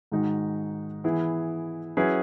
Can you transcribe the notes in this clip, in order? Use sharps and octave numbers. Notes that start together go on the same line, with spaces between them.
G#2 D#3 G#3 D#4 F#4
E3 B3 E4 G#4
F#3 C#4 E4 G#4 B4